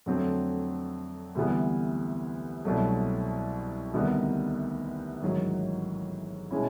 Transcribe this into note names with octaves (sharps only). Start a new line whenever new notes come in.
F2 D3 F#3 A3 C4
D2 C3 E3 G3 B3
C2 B2 F#3 A3
D2 C3 D#3 G3 B3
A1 G#2 D#3 F#3
B2 G#3 C#4 E4